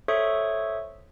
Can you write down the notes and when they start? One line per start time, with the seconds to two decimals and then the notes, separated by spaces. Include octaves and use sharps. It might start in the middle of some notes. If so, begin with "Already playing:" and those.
0.08 A4 C5 C#5 E5 C#6 D#6